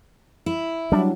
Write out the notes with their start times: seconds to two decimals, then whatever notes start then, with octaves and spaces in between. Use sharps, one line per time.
0.46 E4
0.92 F#3 G3 D4